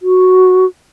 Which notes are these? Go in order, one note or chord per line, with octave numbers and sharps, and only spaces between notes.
F#4